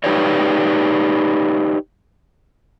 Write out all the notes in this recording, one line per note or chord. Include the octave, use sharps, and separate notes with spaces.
D#4 G4 B4 C#5 D5